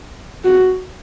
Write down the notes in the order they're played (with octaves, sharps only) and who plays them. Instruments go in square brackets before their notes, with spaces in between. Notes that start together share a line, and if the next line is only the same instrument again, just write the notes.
[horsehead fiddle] F#4